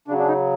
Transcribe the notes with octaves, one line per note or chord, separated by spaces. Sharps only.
C#3 F#3 D4
D4
D#4